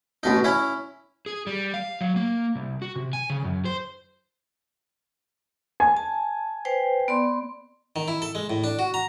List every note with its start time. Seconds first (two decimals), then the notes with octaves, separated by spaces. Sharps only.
0.23 A1 B2 D#4
0.44 C#4 E4
1.26 G#4
1.47 G3
1.74 F5
2.01 F#3
2.16 A#3
2.55 C2
2.82 F#4
2.96 C3
3.13 G#5
3.30 C#3
3.44 F#2
3.65 C5
5.80 G#5
5.97 A5
6.65 B4 C5 G5
7.08 B3 D5 C6
7.96 D#3
8.08 E4
8.22 A4
8.35 G#3
8.50 A2
8.64 D4
8.79 F#4
8.94 A#5